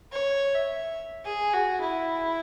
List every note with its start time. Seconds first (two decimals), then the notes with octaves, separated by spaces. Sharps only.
0.12 C#5
0.54 E5
1.25 G#4
1.53 F#4
1.82 E4